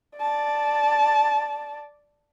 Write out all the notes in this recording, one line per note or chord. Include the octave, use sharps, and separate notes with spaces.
D5 A5